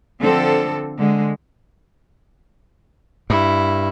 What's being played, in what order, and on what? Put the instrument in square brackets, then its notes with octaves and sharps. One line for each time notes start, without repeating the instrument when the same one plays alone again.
[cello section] D3 F3 C4 A4
D3 G#3
[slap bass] G2 [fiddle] E4